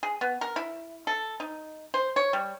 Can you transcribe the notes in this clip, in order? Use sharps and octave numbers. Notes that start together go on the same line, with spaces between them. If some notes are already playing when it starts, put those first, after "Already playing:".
G#4
B3
A#4
E4
A4
D#4
C5
C#5
G3